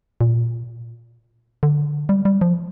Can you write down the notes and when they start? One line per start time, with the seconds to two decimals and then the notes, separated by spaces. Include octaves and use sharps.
0.21 A#2
1.63 D3
2.09 G3
2.25 G3
2.41 F3